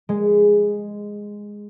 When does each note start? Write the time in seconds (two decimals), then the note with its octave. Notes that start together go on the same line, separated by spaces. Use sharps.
0.09 G#3